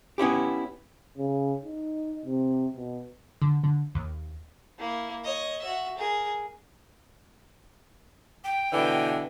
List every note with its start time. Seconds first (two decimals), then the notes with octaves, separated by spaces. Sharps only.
0.18 B3 C#4 E4 G4
1.18 C#3
1.65 D#4
2.25 C3
2.76 B2
3.42 D3
3.64 D3
3.95 D#2
4.79 A#3 E4
5.24 C#5 D#5
5.62 F#4 E5
5.98 G#4 A#4
8.44 G5
8.73 B2 D3 E3